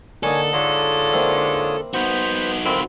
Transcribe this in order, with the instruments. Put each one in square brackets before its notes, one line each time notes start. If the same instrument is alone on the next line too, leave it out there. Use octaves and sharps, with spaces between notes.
[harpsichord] D3 A#3 D#4 [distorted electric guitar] A4 [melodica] C#5 G#5
[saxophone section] G#2 D3 [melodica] F4 C#5 D#6 [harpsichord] A#5
[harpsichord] A#3 C4 E4
[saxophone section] B3 [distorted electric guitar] D#4 F#4 [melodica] C5
[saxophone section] D2 D#3 C4 [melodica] F4 B5